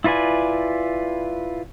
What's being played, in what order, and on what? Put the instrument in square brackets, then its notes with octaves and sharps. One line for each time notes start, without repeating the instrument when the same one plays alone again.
[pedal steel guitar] E4 F4 B4 D5 G#5